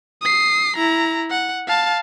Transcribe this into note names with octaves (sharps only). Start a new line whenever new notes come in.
D#6 C7
E4 A#5
F#5
F5 A5